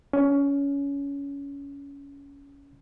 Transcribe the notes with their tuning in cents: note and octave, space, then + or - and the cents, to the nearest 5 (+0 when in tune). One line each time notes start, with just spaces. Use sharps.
C#4 +20